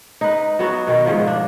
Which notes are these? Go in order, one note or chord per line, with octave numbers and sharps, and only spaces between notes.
D#4 B4
F#3 B3 F#4
B2 D#3
G#2 D3 F3
D4